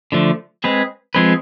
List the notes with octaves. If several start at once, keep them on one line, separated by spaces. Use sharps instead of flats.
D3 F3 A3 D4
G#3 C4 G#4 B4
F3 G#3 C4 G#4 B4